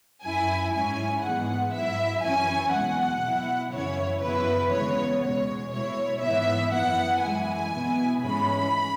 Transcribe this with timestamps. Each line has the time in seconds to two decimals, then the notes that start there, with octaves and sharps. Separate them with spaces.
0.23 F#2 F#3 E4 G#5
0.74 G#2 G#3 C#4 E4 G#5
1.23 G#2 E3 G#3 B3 F#5
1.73 G#2 F#3 E4 E5
2.23 F#2 E3 C#4 E4 G#5
2.73 E2 B2 G#3 F#5
3.23 B2 F#3 E4
3.73 F#2 C#3 E3 C#4 E4 C#5
4.22 F#2 C#3 E3 B3 E4 B4
4.72 E2 C#3 G#3 B3 C#5
5.23 E2 B2 G#3 C#5
5.73 B2 G#3 E4 C#5
6.22 G#2 E3 B3 E4 E5
6.72 F#2 E3 B3 E4 F#5
7.22 F#2 E3 G#3 E4 G#5
7.72 B2 B3 E4
8.22 G#2 E3 G#3 C#4 B5